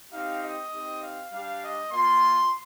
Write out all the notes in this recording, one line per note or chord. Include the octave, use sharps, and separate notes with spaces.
C4 D#4 G4 F5
D#5
C4 D#4 G4
F5
G3 D4 G4 F5
D#5
A#3 F4 C6